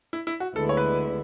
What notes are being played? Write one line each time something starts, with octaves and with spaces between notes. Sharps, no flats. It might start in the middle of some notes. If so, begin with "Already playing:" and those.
E4
E4
F#4
D2 D3 G#3 B3 E4 A4
C#5
B4